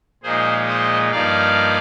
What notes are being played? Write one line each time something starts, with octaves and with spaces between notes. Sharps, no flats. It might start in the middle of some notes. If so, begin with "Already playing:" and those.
A#2 F3 G#3 D#4 G#4 C5
C5 D#5
G2 F3 A#3 D#4 D5 F5